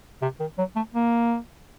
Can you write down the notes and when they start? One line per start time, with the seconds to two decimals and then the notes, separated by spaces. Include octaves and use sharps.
0.22 C3
0.40 D#3
0.58 F#3
0.76 A3
0.94 A#3